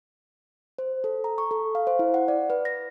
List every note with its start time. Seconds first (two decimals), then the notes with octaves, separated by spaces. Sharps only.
0.78 C5
1.04 A4
1.24 A#5
1.38 C#6
1.51 A4
1.75 F5
1.87 C5
1.99 E4
2.14 F#5
2.28 D5
2.50 B4
2.65 A#6